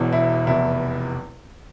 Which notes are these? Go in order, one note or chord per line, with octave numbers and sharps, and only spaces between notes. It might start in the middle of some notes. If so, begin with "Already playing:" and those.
Already playing: E1 E2 B2
E4
F1 E2 B2 E4